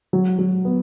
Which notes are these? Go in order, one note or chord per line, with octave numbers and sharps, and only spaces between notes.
F#3
F#3
B3